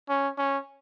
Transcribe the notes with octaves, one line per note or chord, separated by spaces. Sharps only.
C#4
C#4